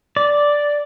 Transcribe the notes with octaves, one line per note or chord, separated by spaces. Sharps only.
D5